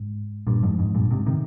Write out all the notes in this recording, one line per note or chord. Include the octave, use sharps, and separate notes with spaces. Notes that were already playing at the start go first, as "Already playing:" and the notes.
Already playing: G#2
G2 A#2
F2 G#2
F2 G#2
G2 A#2
G#2 C3
C3 D#3